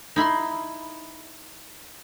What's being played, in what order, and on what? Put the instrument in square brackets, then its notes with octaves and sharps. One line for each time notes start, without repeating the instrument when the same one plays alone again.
[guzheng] D#4 E4 B5 C6